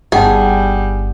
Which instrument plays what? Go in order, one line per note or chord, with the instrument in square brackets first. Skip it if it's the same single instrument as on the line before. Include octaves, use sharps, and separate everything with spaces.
[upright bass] G1 [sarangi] G3 [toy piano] D#4 F#5 G5 [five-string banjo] G#4